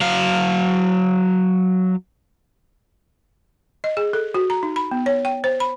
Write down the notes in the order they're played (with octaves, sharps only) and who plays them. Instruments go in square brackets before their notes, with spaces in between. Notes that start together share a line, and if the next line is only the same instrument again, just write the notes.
[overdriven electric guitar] F#3 F5
[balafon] D#5
G#4
A4
F#4
A#5
D#4
B5
B3
C#5
G5
C5
B5